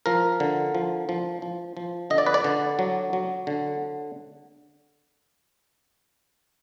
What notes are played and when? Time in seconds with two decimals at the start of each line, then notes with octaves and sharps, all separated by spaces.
0.06 F3 A#4
0.40 D3
0.75 F3
1.09 F3
1.42 F3
1.77 F3
2.10 D3 D#5
2.18 D5
2.26 B4
2.34 D5
2.44 D3
2.79 F#3
3.13 F#3
3.47 D3